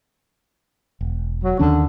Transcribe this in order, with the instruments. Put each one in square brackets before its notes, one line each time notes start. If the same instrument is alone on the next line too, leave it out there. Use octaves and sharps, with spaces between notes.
[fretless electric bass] E1
[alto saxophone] F#3
[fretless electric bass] D#2 D#3 C#4 [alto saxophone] D3